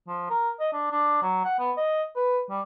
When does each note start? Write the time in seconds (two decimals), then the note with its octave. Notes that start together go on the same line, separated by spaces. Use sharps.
0.08 F3
0.30 A#4
0.60 D#5
0.73 D4
0.91 D4
1.22 F#3
1.44 F#5
1.59 B3
1.77 D#5
2.16 B4
2.50 G3